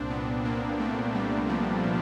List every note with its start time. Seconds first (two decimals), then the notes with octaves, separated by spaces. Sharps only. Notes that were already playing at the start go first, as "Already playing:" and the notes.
Already playing: C2 A#2 C4 D4
0.10 C2 B3
0.45 A#2 A#3
0.80 C2 A3
1.14 A#2 G3
1.49 C2 F3
1.84 A#2 F3